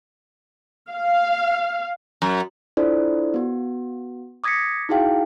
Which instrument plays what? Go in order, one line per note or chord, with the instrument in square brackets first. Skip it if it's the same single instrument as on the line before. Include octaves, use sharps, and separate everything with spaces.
[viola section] F5
[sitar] F#2
[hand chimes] D4 E4 F4 A4 C5 D5
B3 F#4
D6 D#6 G#6 A#6 B6 C#7
D#4 E4 F#4 G#4 F5 G5